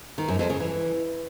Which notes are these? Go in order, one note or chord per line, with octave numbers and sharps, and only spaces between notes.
D#3
F#2
F2
C#3
E3